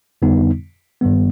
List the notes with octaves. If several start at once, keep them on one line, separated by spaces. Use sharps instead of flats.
F2 D3 G3 B3 D#4
G2 D#3 G3 B3